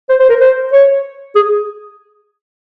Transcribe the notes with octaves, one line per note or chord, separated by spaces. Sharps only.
C5
C5
A#4
C5
C#5
G#4